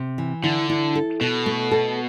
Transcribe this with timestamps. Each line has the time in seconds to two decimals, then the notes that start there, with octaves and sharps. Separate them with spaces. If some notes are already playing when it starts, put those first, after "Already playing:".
Already playing: C3
0.18 E3
0.43 D3 E4
0.70 E4
0.95 A4
1.21 B2 A4
1.46 A3
1.71 A4